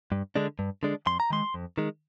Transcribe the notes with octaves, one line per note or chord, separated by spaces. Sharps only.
G2
D3 G#3 D4
G2
D3 G#3 D4
F2 C6
A#5
D#3 G#3 C6
F2
D#3 G#3